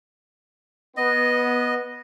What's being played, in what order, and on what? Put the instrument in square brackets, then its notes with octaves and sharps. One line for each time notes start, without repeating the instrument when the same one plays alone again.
[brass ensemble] B3 [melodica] D#5